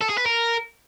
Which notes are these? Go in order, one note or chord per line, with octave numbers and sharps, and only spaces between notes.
A4
G#4
B4
A#4